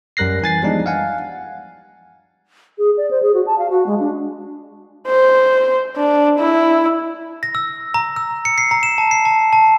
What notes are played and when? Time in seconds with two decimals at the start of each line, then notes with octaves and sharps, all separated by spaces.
0.17 F#2 G3 A#4 F#6 A#6 C7
0.42 E3 G#5 A6 C7
0.62 F3 G3 G#3 B3 D4 D#4
0.86 F5 F#5 G#5
2.78 G#4
2.97 D5
3.11 C5
3.23 G#4
3.34 F#4
3.47 A5
3.58 F5
3.70 F#4
3.86 G#3
4.00 D4
5.07 C5
5.96 D4
6.39 E4
7.43 A#6
7.55 E6
7.94 A#5
8.16 E6
8.45 C#7
8.58 C7
8.71 A#5
8.83 E7
8.98 A5
9.11 C7
9.25 A5
9.53 A5